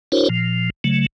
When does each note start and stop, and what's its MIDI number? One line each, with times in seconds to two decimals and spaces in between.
0.12 0.29 62
0.12 0.29 64
0.12 0.29 66
0.12 0.29 70
0.12 0.29 72
0.12 0.29 73
0.29 0.70 46
0.29 0.70 53
0.84 1.06 49
0.84 1.06 54
0.84 1.06 57